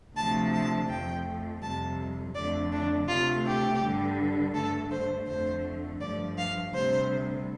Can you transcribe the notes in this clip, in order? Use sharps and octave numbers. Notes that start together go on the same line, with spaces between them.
D2 C3 F3 A3 A5
A5
F2 F3 A3 G5
F2 C3 G3 A5
F2 D3 A3 D5
D4
D2 C3 A3 F4
G4
G2 D3 G3
G2 D3 A3 A4
C5
F2 D3 A3 C5
G2 F3 A3 D5
F5
D2 C3 G3 C5